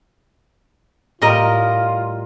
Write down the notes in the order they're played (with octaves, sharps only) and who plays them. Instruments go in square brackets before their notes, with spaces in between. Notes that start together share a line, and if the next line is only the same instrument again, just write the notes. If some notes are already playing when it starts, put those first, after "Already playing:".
[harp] A2 [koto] G3 A#4 D#5 [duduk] F4